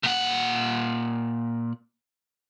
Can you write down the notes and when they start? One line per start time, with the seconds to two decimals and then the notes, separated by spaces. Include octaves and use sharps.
0.03 A#2 F#5